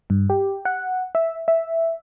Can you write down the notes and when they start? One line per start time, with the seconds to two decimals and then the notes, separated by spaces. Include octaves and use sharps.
0.10 G2
0.30 G4
0.65 F#5
1.15 E5
1.48 E5